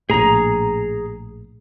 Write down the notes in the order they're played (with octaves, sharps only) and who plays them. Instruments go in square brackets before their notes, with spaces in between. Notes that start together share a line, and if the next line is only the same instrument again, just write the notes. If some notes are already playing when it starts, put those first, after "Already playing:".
[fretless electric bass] A#1 A2 [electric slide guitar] G#4 A#5